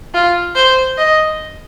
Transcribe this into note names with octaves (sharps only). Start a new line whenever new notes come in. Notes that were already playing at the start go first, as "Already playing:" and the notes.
F4
C5
D#5